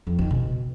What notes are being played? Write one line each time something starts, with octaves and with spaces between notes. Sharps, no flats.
F2
D#3
B2